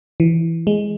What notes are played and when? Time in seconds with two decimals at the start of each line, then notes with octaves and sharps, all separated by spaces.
0.20 E3
0.67 G#3